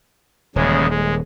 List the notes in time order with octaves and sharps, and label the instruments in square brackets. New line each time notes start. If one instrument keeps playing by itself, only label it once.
[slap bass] D#1 [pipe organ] E2 C#3 G#3
[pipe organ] G#3